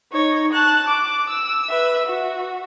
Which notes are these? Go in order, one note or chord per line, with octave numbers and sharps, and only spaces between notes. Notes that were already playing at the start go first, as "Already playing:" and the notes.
D#4 C#5
A5 F#6
D6
E6
B4 E5
F#4